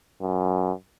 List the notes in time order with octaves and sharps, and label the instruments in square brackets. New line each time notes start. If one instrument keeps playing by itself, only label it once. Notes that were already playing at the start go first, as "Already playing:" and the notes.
[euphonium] F#2